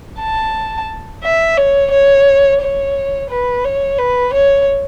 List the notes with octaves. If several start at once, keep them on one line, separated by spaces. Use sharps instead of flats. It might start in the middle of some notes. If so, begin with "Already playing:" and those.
A5
E5
C#5
C#5
C#5
B4
C#5
B4
C#5